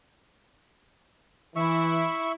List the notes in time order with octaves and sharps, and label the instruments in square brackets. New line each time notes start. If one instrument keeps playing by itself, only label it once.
[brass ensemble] E3 [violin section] E4 [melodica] E5 C#6